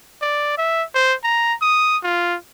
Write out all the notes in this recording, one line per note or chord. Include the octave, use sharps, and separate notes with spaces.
D5
E5
C5
A#5
D#6
F4